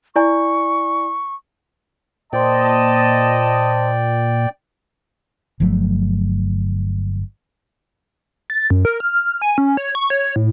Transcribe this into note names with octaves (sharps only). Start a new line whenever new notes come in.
E4 D5 G#5 C#6
A#2 C5 D5 D#5 G5 A5 C6
G1 F3 F#3 A3
A6
F#2
A#4
F6
G#5
C#4
C#5
C#6
C#5
A2